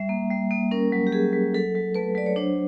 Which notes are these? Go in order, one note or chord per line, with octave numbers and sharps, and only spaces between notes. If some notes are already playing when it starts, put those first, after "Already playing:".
Already playing: G3 E5
A#3
G3
A#3
C#4 A#4
F#3
G4
F#3 G#4
F#3
F#3 A4
F#3
A3 B4
F#3 D5
C#5
D4 C5